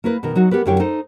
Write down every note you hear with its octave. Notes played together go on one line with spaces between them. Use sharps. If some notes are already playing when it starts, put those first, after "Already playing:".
A#3 E4 A#4 B4
B2 D#3 A#4
F#3 D#4 F#4
B3 G4 A#4 B4
F#2 D3 E4 G4 C#5 G5
D#4 A4 C5